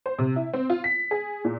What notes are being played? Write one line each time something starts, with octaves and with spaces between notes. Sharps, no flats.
C5
C3
E4
C4
F4
B6
G#4
A#2